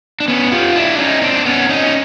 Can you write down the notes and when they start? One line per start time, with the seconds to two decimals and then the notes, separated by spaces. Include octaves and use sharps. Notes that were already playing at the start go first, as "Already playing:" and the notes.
0.20 D4
0.28 B3 C#4
0.52 F4 G4
0.75 D4 E4
0.98 C#4 D#4
1.22 C4 D4
1.45 B3 C#4
1.69 C#4 D#4
1.86 D#4